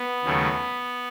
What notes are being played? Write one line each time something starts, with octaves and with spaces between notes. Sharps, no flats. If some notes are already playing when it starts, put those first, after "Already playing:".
Already playing: B3
D#2 C#3 F#3 A3